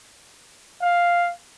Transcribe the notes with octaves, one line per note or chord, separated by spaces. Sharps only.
F5